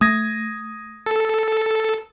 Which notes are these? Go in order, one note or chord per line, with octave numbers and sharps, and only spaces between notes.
A3 D#6 G#6 A#6
A4